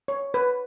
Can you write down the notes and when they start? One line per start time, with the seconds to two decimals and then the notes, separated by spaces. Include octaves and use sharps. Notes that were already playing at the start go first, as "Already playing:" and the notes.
0.08 C#5
0.34 B4